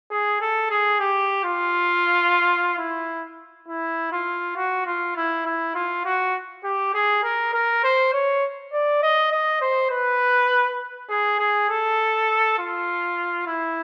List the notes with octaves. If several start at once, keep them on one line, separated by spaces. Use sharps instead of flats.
G#4
A4
G#4
G4
F4
E4
E4
F4
F#4
F4
E4
E4
F4
F#4
G4
G#4
A#4
A#4
C5
C#5
D5
D#5
D#5
C5
B4
G#4
G#4
A4
F4
E4